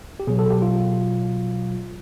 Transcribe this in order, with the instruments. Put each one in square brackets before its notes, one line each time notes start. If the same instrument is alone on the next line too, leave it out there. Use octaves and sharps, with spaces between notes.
[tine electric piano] G4
B2 F#3 G#4
A4
G4
F4